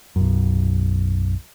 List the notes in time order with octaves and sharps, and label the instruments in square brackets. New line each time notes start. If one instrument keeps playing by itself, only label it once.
[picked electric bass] B1 F#2